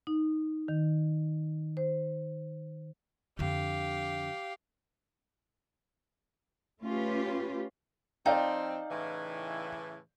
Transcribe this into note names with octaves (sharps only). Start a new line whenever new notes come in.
D#4
D#3
C5
F2 D3 G4 F5
A3 C#4 F4 G4 B4
F3 C4 D#4 D5 F5 G5
A2 C#3 E3